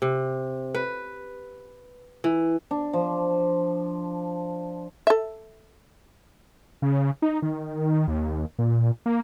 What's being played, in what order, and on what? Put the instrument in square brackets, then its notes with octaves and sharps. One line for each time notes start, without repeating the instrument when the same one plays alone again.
[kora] C3
B4
E3
[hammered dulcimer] D4
F3
[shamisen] A4 E5
[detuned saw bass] C#3
D#4
D#3
D#2
A#2
A#3